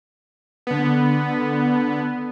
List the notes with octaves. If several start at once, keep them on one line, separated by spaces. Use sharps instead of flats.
D3 B3